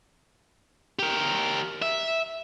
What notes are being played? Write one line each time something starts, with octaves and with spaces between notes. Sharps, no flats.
G4 A#4
E5